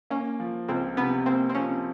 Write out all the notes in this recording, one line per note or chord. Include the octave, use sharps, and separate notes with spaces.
A#3 C#4
F3
C#2 C4
C3 B3
A#3 C4
C4
F3 C#4